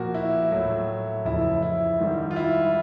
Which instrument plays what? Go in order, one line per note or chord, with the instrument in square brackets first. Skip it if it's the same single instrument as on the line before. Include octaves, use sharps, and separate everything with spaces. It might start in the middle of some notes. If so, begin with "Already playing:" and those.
Already playing: [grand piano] A#2 F3 A#3 F#4
E4
A2 F#3 A3
F2 C#3 E3 E4
E4
G#2 D#3 G3
F4
E4